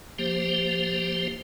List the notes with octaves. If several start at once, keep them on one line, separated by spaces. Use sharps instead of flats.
F3 A#3 G4 C5